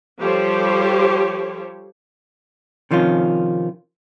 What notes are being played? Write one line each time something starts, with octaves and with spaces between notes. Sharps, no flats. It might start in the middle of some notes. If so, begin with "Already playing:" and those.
F3 G3 G4 A4 C5 C#5
C3 D#3 F3 C#4 F4